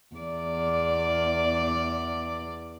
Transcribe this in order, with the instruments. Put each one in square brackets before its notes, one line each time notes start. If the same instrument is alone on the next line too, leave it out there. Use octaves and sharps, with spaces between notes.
[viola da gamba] E2 D5